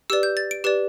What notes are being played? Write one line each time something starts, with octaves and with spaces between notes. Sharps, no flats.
G4 B4 D5 E6
G6
A6
D7
G4 B4 D5